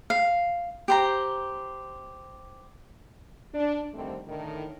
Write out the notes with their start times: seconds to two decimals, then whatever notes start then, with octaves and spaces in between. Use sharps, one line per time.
0.10 F5
0.88 G4 C5 A#5
3.54 D4
3.94 D3 D#3 G3 A3 C4
4.27 A2 D3 D#3